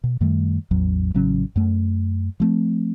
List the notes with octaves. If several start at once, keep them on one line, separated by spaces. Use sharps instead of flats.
B2
F#2 D#3 G3 A3
A1 E2 F#3
A1 C#3 F#3 C#4
F#2 A3
F3 A3 C4